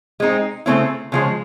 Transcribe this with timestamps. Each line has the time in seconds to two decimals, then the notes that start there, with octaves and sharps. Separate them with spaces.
0.20 G#3 C4 D#4
0.66 C#3 F#3 A3 C4 E4
1.12 C#3 F3 G#3